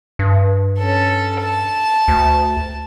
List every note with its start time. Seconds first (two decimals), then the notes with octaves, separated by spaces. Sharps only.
0.19 G2
0.79 C#4 A4
1.41 A5
2.08 D2